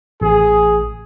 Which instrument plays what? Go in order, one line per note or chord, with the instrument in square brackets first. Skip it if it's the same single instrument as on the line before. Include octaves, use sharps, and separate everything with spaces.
[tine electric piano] A1 [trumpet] G#4